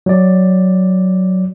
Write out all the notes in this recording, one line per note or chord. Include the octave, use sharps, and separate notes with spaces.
F#3 D5